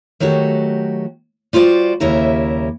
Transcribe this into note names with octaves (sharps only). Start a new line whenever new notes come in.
D#3 F#3 A3 F#4 G4
G3 F4 F#4 C5 D5
D#2 C#3 G3 E4 A#4 E5